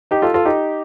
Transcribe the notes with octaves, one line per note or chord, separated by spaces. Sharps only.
D#4 G4
F4 A4
F4 A4
D#4 G4